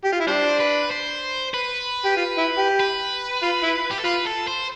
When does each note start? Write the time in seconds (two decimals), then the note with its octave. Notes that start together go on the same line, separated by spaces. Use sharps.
0.05 G4
0.12 F4
0.20 E4
0.27 G3 D4 C5
0.59 B4
0.91 C5
1.54 B4
2.05 G4
2.17 F4
2.38 E4
2.58 G4
2.80 B4
3.43 F4
3.63 E4
3.91 G4
3.98 A4
4.05 F4 B4
4.26 A4
4.47 C5